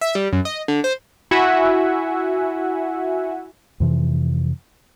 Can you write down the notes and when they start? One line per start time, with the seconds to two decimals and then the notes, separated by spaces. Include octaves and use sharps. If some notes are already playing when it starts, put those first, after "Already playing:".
0.01 E5
0.15 G3
0.33 F#2
0.45 D#5
0.68 D3
0.84 C5
1.31 E4 F#4 E5 F#5 G#5
3.80 F2 C3 E3